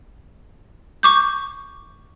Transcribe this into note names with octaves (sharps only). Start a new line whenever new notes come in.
C#6 D6 G6